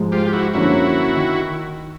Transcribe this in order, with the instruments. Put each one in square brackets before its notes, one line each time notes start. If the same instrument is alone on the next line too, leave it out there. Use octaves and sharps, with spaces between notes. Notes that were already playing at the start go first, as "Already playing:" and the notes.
Already playing: [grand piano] G#2 F3 G#3
[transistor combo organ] F4 G4
G4
E4 F#4
[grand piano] F#2 D3 F3 A#3 C#4 [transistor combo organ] E4 F#4
[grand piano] D#3